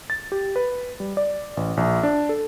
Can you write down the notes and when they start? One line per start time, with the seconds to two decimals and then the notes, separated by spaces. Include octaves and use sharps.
0.10 A6
0.32 G4
0.56 B4
1.00 G3
1.17 D5
1.57 A1
1.77 A#1
2.03 D4
2.29 A4